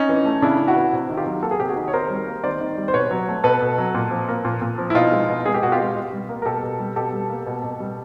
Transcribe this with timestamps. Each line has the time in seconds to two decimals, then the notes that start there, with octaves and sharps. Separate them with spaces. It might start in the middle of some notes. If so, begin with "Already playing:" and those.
Already playing: C#4 D#4
0.09 E3
0.26 A3
0.42 C#3 D4 E4
0.60 C#3
0.67 E4 F#4
0.76 E3
0.93 C3
1.10 D#3
1.17 F4 G4
1.26 F#3
1.42 A#3 A4
1.51 G#4
1.60 C3 G4
1.69 F#4 G#4
1.76 D#3
1.88 C#5
1.93 D#3 A#4 C5
2.10 G3
2.27 A#3
2.44 D#3 C5 D5
2.61 D#3
2.78 G3
2.88 C5
2.94 B2 B4 C#5
3.11 F#3
3.28 A3
3.44 B2 A4 B4
3.62 B2
3.78 F#3
3.95 A#2
4.11 F3
4.28 A#3
4.45 A#2
4.62 A#2
4.78 F3
4.90 E4
4.95 B2 D#4 F4
5.12 G#3
5.29 B2
5.46 G#3 G#4
5.54 G4
5.62 B2 F#4
5.72 F4 G4
5.80 G#3
5.95 B2
6.13 G3
6.29 A#3
6.42 A#4
6.45 B2 G4 A4
6.63 B2
6.80 G3
6.96 B2 G4 A4
7.12 G3
7.30 A#3
7.46 B2
7.64 B2
7.80 G3